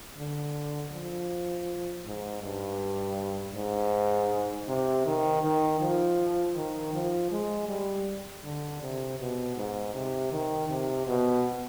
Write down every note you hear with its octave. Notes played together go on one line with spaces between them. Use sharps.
D3
F3
G#2
G2
G#2
C3
D#3
D#3
F3
D#3
F3
G#3
G3
D3
C3
B2
G#2
C3
D#3
C3
B2